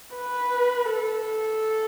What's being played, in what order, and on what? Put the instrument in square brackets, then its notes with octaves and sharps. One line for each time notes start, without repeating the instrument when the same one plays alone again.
[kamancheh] B4
A4